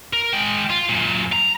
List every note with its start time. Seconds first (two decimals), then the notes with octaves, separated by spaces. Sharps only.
0.13 A#4
0.33 G#3 G5
0.70 F4
0.89 F#2 A#2
1.32 A#5